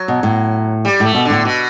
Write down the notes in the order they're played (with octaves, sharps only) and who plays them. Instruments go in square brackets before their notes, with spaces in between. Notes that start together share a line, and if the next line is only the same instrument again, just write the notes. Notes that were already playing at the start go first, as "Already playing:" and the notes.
Already playing: [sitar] F#3
[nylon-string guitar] B2
A2
[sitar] G3
[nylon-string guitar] A2 [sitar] A3
[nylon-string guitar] B2
[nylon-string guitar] A2 [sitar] D3
[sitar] B2